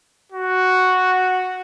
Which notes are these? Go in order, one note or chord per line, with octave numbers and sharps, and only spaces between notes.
F#4